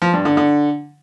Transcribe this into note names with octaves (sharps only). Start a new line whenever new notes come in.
F3
G2
D3
D3